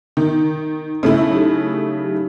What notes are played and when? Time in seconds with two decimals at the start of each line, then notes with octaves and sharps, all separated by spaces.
0.17 D#3
1.03 C#3 A3 E4
1.30 F#3 D#4 G4